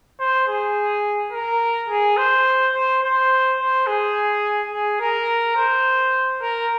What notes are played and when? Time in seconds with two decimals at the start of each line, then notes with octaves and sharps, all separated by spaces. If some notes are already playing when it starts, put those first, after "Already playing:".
0.20 C5
0.48 G#4
1.33 A#4
1.89 G#4
2.17 C5
2.74 C5
3.03 C5
3.60 C5
3.87 G#4
4.72 G#4
5.01 A#4
5.57 C5
6.42 A#4